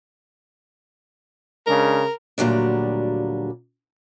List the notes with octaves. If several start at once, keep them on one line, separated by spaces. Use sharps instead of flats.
C#3 G#3 D4 A#4
D2 A#2 F#3 G3 D4